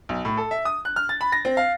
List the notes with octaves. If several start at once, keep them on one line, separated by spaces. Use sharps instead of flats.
B1
A2
A4
E5
D#6
F#6
F6
A6
B5
A#6
C4
F5